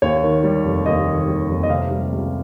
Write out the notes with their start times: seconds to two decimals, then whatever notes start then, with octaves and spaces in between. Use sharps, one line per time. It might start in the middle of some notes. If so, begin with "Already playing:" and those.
0.02 D#2 C#5
0.23 D#3
0.43 G3
0.65 F1
0.86 D#2 D#5
1.07 D#3
1.28 G3
1.49 F1
1.63 D#5
1.69 C3 F5
1.91 G3
2.12 C#2